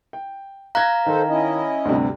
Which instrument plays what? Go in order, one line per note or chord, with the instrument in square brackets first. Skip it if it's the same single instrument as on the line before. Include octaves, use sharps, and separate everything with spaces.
[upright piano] G5
[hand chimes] F5 A#5 [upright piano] F#6 G#6 A#6
[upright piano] D#3 [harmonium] A4 C5
[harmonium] C#4 E4 D#5
[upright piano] D2 G2 C3